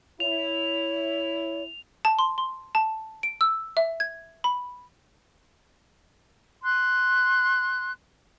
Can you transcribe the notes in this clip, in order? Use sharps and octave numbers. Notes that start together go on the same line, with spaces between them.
E4 C#5 F7
A5
C6
C6
A5
D7
E6
E5
G#6
B5
C6 F#6